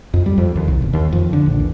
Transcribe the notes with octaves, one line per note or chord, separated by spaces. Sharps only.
F2
G3
F2
D#2
C2
E1
D#2
F2
D3
A#1
E2